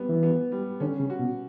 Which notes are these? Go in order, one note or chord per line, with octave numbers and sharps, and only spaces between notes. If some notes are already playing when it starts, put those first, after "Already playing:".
Already playing: G3 B3
E3
B3
G3
D3 C#4
C#3
F#4
B2